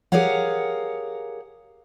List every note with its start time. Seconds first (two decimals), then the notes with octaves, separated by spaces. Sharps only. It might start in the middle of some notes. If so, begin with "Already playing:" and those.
0.12 G4 G#4 A#4 C#5 F5 F#5